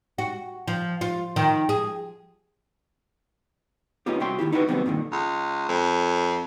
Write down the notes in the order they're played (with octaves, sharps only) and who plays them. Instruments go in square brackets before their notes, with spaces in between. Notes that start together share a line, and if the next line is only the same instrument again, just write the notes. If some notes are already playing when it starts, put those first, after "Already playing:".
[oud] F#4
F3
F4
D#3
G#4
[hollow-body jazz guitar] A3 B3 C#4 D#4 F4 G4
C2 F#4 E5 G5 C6
D#2 C3 E4 G4
D#4 E4 F#4 G4 A4 B4
C3 D#3 F#3 G3 B3
G2 A#2 D3 D#3
[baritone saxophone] C#2
F2